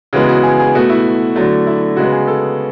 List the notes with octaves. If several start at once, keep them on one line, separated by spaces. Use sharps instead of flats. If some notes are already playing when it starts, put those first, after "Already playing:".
C#3 E3 G#3 B3 F#4
F#4
G#4
G#4
B2 A3 F#4
E4
D3 F#3 A3
E4
C#3 G#3 B3 F#4
G#4
A4